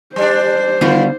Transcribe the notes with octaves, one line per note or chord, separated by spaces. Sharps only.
G3 D4 C5
D3 D#3 G3 B3 F4 F#4